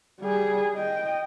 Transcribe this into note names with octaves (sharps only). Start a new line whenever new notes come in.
G3 G#4
D#5 G5